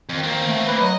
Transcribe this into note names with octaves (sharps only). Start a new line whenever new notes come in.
F2 D#3
A#3 C4
A3
B4
F#3 D#5